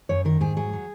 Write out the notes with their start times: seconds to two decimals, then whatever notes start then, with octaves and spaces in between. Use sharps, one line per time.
0.09 F#2 C#5
0.25 D#3 A#4
0.41 G#2 G#4
0.57 F#3 G#4
0.73 F#3